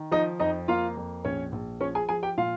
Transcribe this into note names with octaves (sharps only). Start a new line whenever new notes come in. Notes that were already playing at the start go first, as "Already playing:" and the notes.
Already playing: D#3
F3 D#4 D#5
F2 D#4 D#5
A#3 F4 F5
F2
A#1 C#4 C#5
A#1
F3 C#4 C#5
G#4 G#5
F3 G#4 G#5
G4 G5
A#2 F4 F5